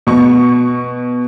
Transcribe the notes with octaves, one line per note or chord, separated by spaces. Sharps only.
B2 C#6